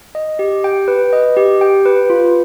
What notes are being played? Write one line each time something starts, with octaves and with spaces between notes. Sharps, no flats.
D#5
G4
G5
B4
D#5
G4
G5
B4
F4